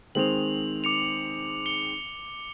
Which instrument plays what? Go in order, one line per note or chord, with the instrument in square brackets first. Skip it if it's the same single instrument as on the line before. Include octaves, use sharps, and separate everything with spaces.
[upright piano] D#3 G#3 C4 [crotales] F7 F#7
[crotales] D6 C#7 F7
C#7 G7